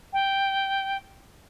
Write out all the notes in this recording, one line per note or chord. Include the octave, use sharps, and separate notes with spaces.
G5